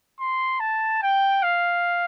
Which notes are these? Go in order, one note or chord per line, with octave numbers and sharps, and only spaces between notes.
C6
A5
G5
F5